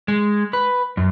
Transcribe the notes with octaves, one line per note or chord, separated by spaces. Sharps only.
G#3
B4
F#2